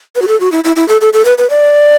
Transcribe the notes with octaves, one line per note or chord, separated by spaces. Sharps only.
B4
F#4
A4
F#4
E4
E4
E4
A4
A4
A4
B4
B4
D5